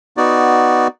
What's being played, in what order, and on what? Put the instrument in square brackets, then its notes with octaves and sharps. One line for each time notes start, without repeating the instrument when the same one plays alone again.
[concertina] B3 D#4 F#4 D5